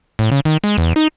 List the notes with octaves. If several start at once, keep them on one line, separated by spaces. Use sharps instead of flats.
A2
C#3
D#3
G#3
E2
D#4